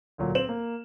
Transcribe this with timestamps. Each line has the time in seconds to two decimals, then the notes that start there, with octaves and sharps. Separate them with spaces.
0.18 D2 A#2 F#3
0.35 C4 C5 E7 F#7
0.49 A#3